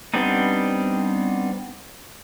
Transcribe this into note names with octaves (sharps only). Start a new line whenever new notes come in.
G3 B3 C4 D4 D#4